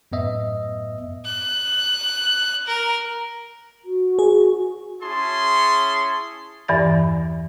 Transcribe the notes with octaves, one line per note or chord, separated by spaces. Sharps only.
F#2 A2 B3 D#5 E5
F#6
A#4
F#4
G#4
C#4 E4 G#4 A5 C6
E2 G2 E3 D5 A6